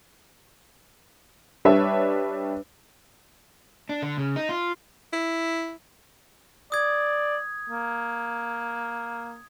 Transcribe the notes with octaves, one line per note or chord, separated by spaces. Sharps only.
G3 D4 B4 C#5 E5
D4
D3
C#3
D#4
F4
E4
D5 D#6 G#6
A#3